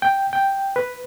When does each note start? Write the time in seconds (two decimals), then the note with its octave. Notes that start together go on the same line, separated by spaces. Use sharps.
0.02 G5
0.33 G5
0.76 B4